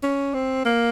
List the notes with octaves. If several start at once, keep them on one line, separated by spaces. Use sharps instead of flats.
C#4
C4
A#3